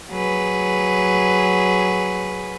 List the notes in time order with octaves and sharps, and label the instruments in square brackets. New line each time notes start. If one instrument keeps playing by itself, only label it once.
[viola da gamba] F#3 G#4 B4